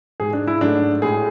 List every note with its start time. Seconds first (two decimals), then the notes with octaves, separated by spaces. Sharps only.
0.20 G#2 G#3 G#4
0.33 D4
0.47 E4
0.61 G#2 F#3 A3 D4
1.02 A2 G#3 G#4